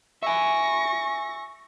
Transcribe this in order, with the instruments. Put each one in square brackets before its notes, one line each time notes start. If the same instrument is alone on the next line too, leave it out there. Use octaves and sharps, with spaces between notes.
[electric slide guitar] E5 G#5 [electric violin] C#6 A#6